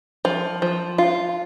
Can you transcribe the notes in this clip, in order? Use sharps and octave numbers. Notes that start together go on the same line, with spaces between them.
F3
F3
F4